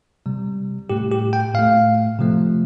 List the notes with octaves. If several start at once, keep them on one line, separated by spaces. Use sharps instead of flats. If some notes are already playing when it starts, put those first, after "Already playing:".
C3 G3
A2 A3 G4
G4
G5
A2 A3 F5
C3 F3 A3